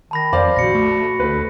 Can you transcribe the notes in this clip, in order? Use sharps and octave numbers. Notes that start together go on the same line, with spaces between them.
D#3 A5 B5 A#6
F2 C5 D5 F5
A#1 F#4 A#6 C#7
A3
D2 A3 B4